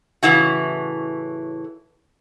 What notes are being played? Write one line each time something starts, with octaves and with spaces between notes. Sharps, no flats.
A2 C#3 E3 E4 F#4